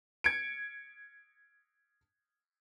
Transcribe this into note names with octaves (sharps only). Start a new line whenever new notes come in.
G#6 C#7 D7